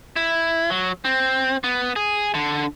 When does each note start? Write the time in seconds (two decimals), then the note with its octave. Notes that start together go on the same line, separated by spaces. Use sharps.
0.16 E4
0.70 F#3
1.05 C4
1.64 B3
1.96 G#4
2.35 D3